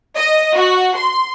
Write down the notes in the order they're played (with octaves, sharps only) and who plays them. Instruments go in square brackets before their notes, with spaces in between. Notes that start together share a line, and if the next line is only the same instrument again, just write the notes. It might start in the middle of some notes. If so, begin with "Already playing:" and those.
[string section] D#5
F#4
C6